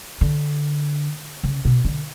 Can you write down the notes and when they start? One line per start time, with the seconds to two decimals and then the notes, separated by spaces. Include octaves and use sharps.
0.21 D3
1.44 C#3
1.65 B2
1.84 D3